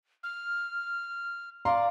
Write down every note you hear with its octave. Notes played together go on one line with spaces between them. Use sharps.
F6
D5 F5 A#5 C6